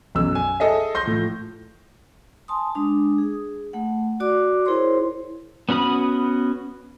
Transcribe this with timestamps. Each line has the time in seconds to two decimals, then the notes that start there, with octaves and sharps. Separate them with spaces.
0.15 B1 F#2 E6
0.35 G#5
0.60 G#4 A4 D#5 E5
0.95 C6 G6 A#6
1.06 A2 F3
2.48 G#5 A5 C6 D#6
2.75 G#3 D4 D#6
3.18 G#4
3.73 A3 F#5
4.20 F#4 D5 D6
4.65 E4 G#4 A#4 C5 C#5 C6
5.69 B3 C#4 F#4 B5 D#6